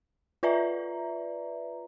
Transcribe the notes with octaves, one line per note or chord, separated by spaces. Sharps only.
F4 B4 D5 E5 A#5